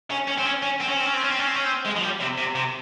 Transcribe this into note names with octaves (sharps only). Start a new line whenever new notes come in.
C#4
C#4
C4
C#4
C#4
C4
C#4
C4
C#4
C4
C#4
C4
C#4
C4
C#4
C4
G#3
F3
G3
C3
C3
C3